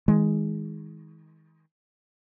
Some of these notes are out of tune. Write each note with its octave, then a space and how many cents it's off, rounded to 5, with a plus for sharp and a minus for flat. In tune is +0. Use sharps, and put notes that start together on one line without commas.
D#3 +40 G#3 +0